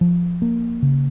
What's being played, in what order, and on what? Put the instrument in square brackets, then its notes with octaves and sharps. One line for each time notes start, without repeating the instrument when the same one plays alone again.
[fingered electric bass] F3
A#3
C#3